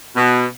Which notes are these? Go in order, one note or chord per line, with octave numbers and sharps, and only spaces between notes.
B2